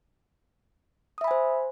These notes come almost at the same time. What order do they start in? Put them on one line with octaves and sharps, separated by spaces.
D#6 E5 B5 G#5 C5